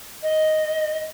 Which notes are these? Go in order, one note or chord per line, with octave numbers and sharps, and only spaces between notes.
D#5